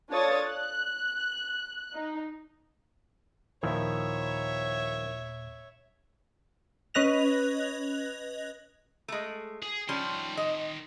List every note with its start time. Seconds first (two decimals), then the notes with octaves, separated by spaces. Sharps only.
0.10 D4 F4 A4 C#5 D#6 A6
0.47 F#6
1.94 D#4
3.63 D#2 A#2 D#3 F3 E4 C#5 E5
6.94 C#4 B4 D#5 F#6 A#6 F7
9.08 G#3 A3
9.63 G#4
9.89 D#3 F3 G3 C#4 C6
10.37 D#5